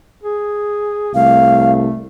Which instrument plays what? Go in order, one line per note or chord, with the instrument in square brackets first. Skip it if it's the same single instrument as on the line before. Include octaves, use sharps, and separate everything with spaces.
[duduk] G#4
[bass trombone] C2 [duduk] A3 [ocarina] F5